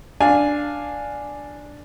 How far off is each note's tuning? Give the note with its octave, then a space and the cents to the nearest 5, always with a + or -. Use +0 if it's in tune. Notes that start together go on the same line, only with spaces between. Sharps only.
D4 +0 F5 +0 G#5 +0